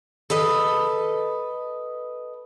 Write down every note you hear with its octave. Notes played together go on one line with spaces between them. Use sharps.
A4 B4 D#5